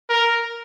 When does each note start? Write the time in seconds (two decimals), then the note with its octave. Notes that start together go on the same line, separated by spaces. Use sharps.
0.10 A#4